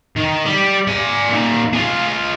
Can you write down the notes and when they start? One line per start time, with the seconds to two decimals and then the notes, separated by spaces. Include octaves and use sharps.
0.16 D#3
0.46 G3 G4
0.88 D5 G#5
1.29 A#2 D#3
1.74 F4 G#4